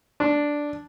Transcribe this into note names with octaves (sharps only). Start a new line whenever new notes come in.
D4